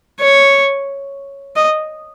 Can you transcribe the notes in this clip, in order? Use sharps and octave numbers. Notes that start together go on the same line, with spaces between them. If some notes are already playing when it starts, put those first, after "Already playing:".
C#5
D#5